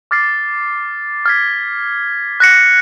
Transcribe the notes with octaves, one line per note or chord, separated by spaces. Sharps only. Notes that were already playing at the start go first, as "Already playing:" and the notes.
D6 F6 A6 C7
F6 G#6 B6
F#6 A#6 C#7